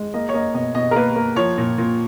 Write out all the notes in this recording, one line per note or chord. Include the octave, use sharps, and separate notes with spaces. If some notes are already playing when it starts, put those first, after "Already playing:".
Already playing: G#3
A#3 D#5
C#5
A#3 D#5
B2 D#5
B2 D#5
A#4
A#3 B4
A#3
F3 C#5
A#2
A#2